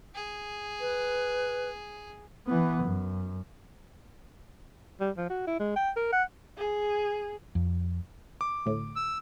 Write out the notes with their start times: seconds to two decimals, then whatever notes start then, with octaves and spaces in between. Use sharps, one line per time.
0.15 G#4
0.81 B4
2.47 E3 B3
2.83 F#2
5.00 G3
5.17 F3
5.30 F#4
5.47 E4
5.59 G#3
5.76 G5
5.97 A#4
6.13 F#5
6.57 G#4
7.55 F2
8.41 D6
8.66 D2 A2
8.96 E6